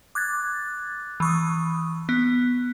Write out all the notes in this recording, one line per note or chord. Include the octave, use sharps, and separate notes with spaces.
D6 F#6 G#6 A6
E3 C#6 D#6
B3